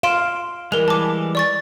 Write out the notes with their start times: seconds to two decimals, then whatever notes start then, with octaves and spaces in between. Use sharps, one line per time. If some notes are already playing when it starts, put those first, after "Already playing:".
0.03 F5 C6 D7 E7
0.72 E3 G3 G#3 A#4 F7
0.88 A5 D6
1.35 D5 C#6 A6